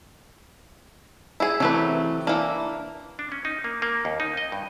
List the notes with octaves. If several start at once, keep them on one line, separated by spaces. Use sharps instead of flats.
E4 G#4
C3 E3 F#3 A3 B4
E3 A#3 D4
D4
C#4
D#4
A#3
A#3
D#2
D#4
D#5
G2